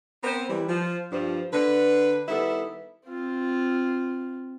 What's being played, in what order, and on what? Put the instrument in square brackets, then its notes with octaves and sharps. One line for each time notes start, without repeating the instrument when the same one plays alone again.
[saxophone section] B3 C4 A#4 C5
E3 G3
F3
G2 F3
D3 B4
D#3 G3 B3 E4 A4
[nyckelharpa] C4 F4